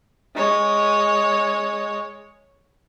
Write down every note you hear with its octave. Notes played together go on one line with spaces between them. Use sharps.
G#3 C#5